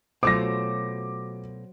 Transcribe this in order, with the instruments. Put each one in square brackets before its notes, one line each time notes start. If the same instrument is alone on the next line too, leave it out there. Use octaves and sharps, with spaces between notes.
[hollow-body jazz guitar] B2 A3 F4 [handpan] F#3 C5 [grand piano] D6 A#6